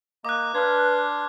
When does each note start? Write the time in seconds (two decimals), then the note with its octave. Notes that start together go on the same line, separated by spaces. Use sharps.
0.25 A#3 D#5 D6 F#6
0.55 D4 B4 C6 F6 G#6